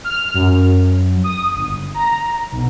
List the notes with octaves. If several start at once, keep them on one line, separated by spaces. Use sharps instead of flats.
F6
F#2
D#6
G1
A#5
B1